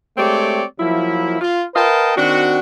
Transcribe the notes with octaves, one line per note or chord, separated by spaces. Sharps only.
G#3 A3 C4 G4 C#5 D5
F3 F#3 A#3 E4
F4
A#4 B4 D#5 F5 G5 A5
D#3 C4 D4 F#4